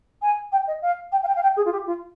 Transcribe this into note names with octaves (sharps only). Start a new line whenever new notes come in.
G#5
G5
D#5
F5
G5
F5
G5
F5
G5
G#4
F4
G4
F4